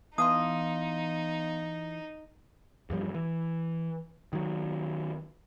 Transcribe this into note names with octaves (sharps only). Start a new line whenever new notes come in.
E3 B3 D#4 F5 A5 C6 D#6
E2 G2 F3 G3
E3
D#3 F#3